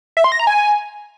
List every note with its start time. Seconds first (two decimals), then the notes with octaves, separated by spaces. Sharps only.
0.17 E5
0.24 C6
0.32 A#6
0.40 A#5
0.47 G#5